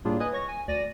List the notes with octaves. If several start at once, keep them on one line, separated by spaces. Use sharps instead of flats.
A2 G3 A#3 D4 F4 G#4
B4 D#5 G#5 D#6 F#6 G#6
C#5 C#6 A#6
G#5
D2 D5 A#6 D#7